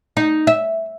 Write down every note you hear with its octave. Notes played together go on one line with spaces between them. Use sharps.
D#4
E5